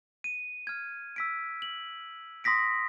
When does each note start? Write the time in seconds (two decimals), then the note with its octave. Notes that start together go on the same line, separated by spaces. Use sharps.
0.24 D#7
0.67 F6 G#6
1.16 E6 B6 D7
1.62 F#7
2.44 C6 D#6 A#6 B6 D7